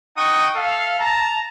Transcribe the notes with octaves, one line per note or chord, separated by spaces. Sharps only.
D#4 F#5 G5 C#6 D#6
A4 E5 F5
A5 A#5